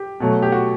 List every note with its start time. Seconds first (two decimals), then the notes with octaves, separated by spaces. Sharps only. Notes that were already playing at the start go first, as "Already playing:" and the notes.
Already playing: G4
0.20 B2 F#3 A3
0.42 G4
0.52 F#4